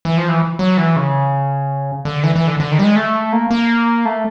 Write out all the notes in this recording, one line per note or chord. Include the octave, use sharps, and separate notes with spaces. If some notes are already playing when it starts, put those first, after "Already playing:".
E3
F3
E3
F#3
E3
C#3
D3
E3
E3
D3
D3
D#3
G3
G#3
A3
A#3
A#3
A3